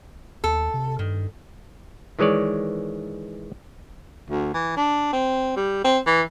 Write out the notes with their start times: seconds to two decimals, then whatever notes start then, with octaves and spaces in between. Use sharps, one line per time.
0.44 D#2 A4
0.74 C3
0.99 G2 D#3
2.19 D#3 E3 G#3 C#5 D5
4.30 D2
4.54 E3
4.77 D4
5.13 C4
5.56 G3
5.84 C4
6.06 E3